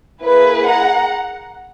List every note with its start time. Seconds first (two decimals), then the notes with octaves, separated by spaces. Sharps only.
0.23 A#3 E4 G#4 B4
0.67 F#5 A#5